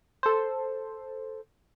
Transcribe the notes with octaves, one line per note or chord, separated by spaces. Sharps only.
A4 C5